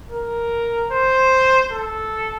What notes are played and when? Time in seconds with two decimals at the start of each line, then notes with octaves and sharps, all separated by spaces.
0.11 A#4
0.91 C5
1.72 A4